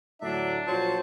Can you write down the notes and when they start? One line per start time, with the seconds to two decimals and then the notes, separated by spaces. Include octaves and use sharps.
0.21 D2 A2 F#3 D4 E5
0.67 A#1 F#3 F4 C5 A5